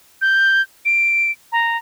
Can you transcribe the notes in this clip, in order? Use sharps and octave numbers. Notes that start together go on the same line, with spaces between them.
G6
D7
A#5